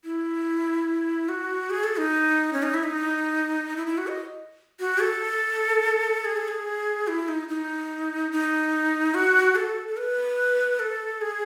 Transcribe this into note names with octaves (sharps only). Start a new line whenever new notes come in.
E4
F#4
G#4
A4
D#4
C#4
D#4
E4
D#4
E4
E4
F#4
D#5
F#4
A4
G#4
A4
G#4
E4
D#4
D#4
D#4
F#4
A4
A4
B4
A4
G#4